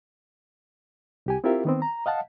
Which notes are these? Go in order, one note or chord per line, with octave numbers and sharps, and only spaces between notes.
C2 G4 G#5
C4 E4 F4 G4 A#4 E5
D#3 B3 C4
A#5
D#5 F5 F#5 A5